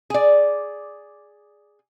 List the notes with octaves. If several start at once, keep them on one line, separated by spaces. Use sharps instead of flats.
G#4 D5